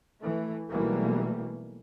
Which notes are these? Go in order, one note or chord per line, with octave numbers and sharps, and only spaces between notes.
E3 A3
B1 B2 E3 G3 A3 A#3